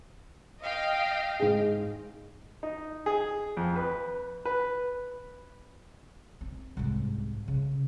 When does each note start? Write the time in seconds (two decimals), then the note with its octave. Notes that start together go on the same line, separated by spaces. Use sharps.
0.63 D#5 F5 G5
1.40 G#2 G#4
2.63 D#4
3.06 G#4
3.57 F2
3.76 B4
4.45 B4
6.41 C4
6.77 C2 G#2
7.48 C#3